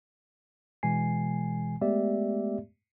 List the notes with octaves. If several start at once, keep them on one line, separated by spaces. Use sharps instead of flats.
B2 E3 G#3 G#5 C7
G#3 A3 B3 G4 D5 E5